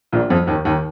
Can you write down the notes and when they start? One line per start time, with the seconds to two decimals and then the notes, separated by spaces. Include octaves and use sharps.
0.12 A#1 A#2
0.30 F2 F3
0.47 D#2 D#3
0.65 D#2 D#3